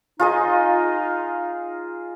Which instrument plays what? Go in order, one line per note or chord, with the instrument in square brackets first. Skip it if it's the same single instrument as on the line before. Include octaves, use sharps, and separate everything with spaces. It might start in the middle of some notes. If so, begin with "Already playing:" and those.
[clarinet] D#4 [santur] F4 G#4 D#5